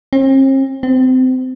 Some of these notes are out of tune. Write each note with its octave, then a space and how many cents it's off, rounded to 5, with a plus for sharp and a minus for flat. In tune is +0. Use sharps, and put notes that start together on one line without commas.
C4 +45
C4 -25